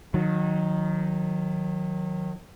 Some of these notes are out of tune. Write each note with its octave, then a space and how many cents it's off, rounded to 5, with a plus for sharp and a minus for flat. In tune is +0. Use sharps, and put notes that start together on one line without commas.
D#3 +0 F#3 -30